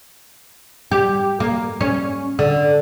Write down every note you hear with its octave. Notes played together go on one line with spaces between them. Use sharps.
G4
A#3
C#4
D3